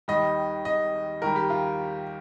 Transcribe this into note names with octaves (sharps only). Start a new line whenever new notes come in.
D#2 D#3 G3 D#5
D#5
D#2 D#3 G3 A#4
G4
F4